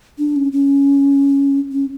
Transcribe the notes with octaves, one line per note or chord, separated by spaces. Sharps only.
D4
C#4
C#4
C#4